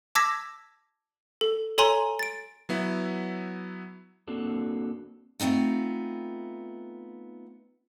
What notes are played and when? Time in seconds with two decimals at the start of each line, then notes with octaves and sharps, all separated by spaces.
0.15 A5 D6 E6 G#6 A#6 B6
1.41 A4
1.78 A4 C#5 G#5 A#5 C6 F#7
2.19 A6 D7
2.69 F#3 B3 E4
4.28 A#3 C4 D4 F#4 A4
5.40 A3 B3 C4 D#4 F4